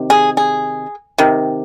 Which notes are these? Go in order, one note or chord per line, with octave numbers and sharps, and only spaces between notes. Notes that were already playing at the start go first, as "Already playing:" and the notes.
Already playing: C3 D#3
G#4
G#4
C3 D#3